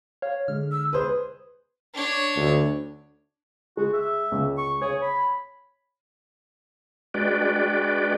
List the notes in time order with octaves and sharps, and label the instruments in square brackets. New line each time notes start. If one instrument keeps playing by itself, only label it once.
[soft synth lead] C#5 [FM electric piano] F5
[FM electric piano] D3 G#3 [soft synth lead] F6
[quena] E6
[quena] G#4 [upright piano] B4 C5
[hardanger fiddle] D4 C#5
[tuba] D2
[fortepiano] G#3 [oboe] F#4
[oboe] E5
[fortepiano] C#2
[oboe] C#6
[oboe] G#4 [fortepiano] C#5
[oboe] B5
[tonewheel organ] G#3 D4 F#4 B4 D5 G5